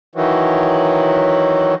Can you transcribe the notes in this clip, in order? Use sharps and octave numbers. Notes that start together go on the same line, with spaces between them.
D#3 E3 F#3